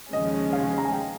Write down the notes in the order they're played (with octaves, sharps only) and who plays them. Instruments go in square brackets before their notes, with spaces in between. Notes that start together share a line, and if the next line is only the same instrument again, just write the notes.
[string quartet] D#2 C#3 F3 G#3 C#4 [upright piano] D#5
[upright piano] F5
A#5
G#5
G5